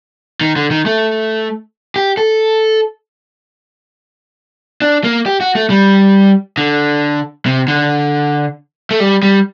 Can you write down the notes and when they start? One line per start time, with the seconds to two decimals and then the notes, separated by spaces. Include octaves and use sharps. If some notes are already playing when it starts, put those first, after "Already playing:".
0.41 D#3
0.56 D3
0.71 D#3
0.86 A3
1.96 G4
2.17 A4
4.82 D4
5.04 A#3
5.26 G4
5.41 F#4
5.55 A3
5.70 G3
6.58 D3
7.46 C3
7.68 D3
8.91 A3
9.00 G3
9.23 G3